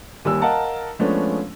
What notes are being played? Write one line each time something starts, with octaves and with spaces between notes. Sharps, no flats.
D#2 G3 G#5 E6
A#4 D#5 F5 F#5 A5 A#5
F3 G#3 A3 B3 C#4 D4